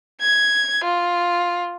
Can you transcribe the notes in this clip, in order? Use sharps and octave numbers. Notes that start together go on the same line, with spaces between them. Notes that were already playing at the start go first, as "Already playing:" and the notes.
G#6
F4